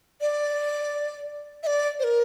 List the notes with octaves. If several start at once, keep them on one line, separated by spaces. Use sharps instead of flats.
D5
E5
D5
C5
A#4